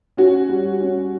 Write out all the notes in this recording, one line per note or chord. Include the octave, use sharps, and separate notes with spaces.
C#4 F#4
G3
C#4